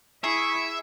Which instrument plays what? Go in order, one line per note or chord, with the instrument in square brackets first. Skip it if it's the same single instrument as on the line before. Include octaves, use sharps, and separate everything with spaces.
[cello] E4 [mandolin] G#4 [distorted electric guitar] E5 [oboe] C#6